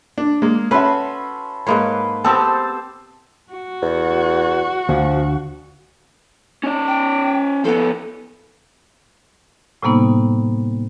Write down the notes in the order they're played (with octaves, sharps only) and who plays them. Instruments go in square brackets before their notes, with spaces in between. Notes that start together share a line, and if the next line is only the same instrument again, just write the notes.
[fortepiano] D4
G#3 A#3
[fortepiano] C#4 E5 [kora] F#4 B4 [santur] A4 B5 C6
[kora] G#2 A#3 C#5 [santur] B4 C6
[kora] B3 C4 G4 [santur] A4 C5 A5
[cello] F#4
[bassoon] E2
[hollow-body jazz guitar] D2 [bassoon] F3
[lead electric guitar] C#4 D5
[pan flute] G5
[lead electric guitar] F3 B3 [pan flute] A4
[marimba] A2 C3 G3 A#3 B3 D#4